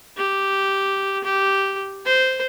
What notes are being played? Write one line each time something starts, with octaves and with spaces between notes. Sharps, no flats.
G4
G4
C5